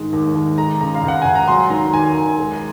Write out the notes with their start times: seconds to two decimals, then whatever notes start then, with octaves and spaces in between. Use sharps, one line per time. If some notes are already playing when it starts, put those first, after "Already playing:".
Already playing: G#2 D#3 G#3
0.13 D#2
0.35 D#2
0.58 G#3 A#5
0.80 C#3 A#5
0.95 F5
1.03 C#2
1.08 F#5
1.22 C#2 G#5
1.35 A#5
1.48 F#3 C6
1.70 D#3 A#5
1.93 D#2 G#5
2.16 D#2
2.38 G#3